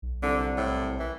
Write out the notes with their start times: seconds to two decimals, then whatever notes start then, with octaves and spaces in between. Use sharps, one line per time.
0.02 B1
0.23 C2 D3
0.57 A2
0.99 E3